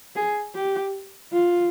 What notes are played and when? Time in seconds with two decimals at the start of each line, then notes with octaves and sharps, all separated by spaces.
0.16 G#4
0.55 G4
1.33 F4